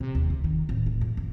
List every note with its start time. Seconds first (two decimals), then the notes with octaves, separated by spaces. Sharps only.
0.01 C3
0.15 D#2
0.30 D2
0.44 D#3
0.69 D1
0.86 A2
1.01 F2
1.17 F2